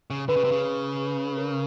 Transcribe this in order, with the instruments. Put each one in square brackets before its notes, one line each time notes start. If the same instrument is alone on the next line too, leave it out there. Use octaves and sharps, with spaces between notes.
[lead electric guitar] C#3
[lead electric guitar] D3 [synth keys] B4
[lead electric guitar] C#3
C3
C#3
[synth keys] A#4